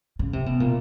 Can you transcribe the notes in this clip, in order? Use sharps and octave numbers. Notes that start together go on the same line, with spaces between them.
C#3
C3
B2
A#2